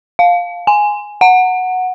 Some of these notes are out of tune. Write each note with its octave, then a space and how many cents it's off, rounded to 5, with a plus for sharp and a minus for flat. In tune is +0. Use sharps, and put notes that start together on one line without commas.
F5 +10
G#5 +0
F#5 -5